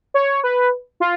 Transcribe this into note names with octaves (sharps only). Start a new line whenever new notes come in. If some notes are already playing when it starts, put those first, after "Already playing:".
C#5
B4
F4